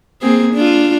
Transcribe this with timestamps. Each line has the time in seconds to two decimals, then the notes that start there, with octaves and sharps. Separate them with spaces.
0.22 A#3 C4 G#4
0.54 D4 F4